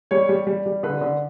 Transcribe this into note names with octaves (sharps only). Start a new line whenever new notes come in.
G3 C#5
G3
G3
G3
D3 B4
D3